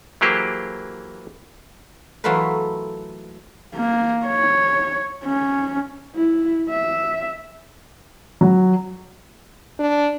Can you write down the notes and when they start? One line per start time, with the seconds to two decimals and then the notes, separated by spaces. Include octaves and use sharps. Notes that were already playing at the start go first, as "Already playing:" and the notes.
0.21 E3 F#3 A#3 G4 G#4 C5
2.24 E3 F#3 A3 F4 A#4 B4
3.75 A#3
4.26 C#5
5.24 C#4
6.16 E4
6.69 E5
8.41 F#3
9.79 D4